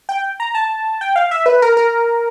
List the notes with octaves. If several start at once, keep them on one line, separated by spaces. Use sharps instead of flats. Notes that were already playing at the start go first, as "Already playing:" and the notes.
G5
A#5
A5
G5
F5
E5
B4
A#4
A#4